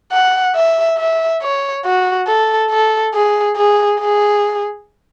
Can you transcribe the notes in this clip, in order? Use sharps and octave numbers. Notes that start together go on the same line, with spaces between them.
F#5
E5
E5
C#5
F#4
A4
A4
G#4
G#4
G#4